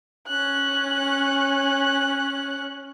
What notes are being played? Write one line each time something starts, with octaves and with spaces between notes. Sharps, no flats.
C#4 F#6